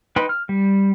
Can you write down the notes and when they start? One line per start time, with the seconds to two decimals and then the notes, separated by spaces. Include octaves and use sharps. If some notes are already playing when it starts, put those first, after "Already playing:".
0.16 D#4 B4 G5 B5 C6
0.29 F6
0.49 G3